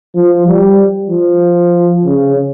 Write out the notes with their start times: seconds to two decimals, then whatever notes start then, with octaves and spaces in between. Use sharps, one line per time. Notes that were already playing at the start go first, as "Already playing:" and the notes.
0.15 F3
0.47 G3
1.10 F3
2.05 C#3